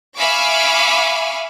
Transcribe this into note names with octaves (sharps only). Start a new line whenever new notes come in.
E5 F5 G#5 B5 C#6 D6